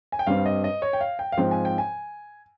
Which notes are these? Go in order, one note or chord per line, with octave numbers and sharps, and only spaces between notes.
G#5
G5
G2 G3 C4 F5
D#5
D#5
C#5
G5
F5
G5
F5
G#2 F3 C4 G5
G#5
G5
G#5